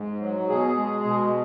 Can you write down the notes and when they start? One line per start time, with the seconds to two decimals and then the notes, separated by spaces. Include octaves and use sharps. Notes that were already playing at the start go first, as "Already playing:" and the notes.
Already playing: G#2
0.21 F#3
0.49 B2 G#4
0.77 G#3
1.05 B2